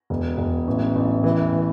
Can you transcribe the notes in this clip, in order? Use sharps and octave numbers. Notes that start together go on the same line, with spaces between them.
E1
E1
A1
A1
E3
E3